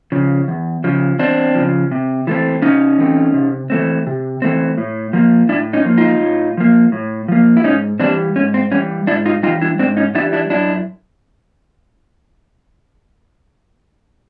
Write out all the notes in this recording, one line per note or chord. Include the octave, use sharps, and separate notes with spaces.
C#3 F3
E2
C#3 F3
E2 C4 D4
C#3 F3
C3
E3 A3 C4
C3 C#4 D#4
E3 A3 C4
C3
E3 A3 C4
C3
E3 A3 C4
A2
F3 A#3
A2 D4 E4
C#4 D#4
F3 A#3
D#4 F4
A2
F3 A#3
A2
F3 A#3
E4
G#2 C#4 D#4
E3 G3 C4 D4
G#2 C#4
C4
E3 G3 C#4
G#2 D4 E4
D#4 F4
E3 G3 D#4 F4
D4 E4
G#2 C4 D4
C#4 D#4
E3 G3 D4 E4
D4 E4
F#2 D4 E4